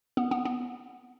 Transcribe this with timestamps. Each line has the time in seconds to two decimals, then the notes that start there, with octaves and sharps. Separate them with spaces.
0.17 B3
0.31 B3
0.45 B3